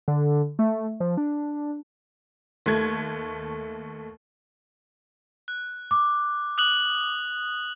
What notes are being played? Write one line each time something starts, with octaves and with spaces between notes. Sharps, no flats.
D3
A3
F3
D4
D#2 A3 G#6
F#6
D6
D#6 F#6 F#7